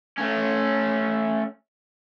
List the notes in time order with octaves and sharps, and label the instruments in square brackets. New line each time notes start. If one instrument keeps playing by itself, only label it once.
[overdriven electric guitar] A3 C#4